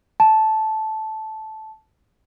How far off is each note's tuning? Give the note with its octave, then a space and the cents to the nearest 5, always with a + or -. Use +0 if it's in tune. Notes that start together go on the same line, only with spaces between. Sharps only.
A5 -10